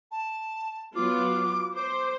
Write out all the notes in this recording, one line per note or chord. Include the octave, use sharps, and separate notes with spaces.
A5
F#3 B3 F4 D6
C5 D6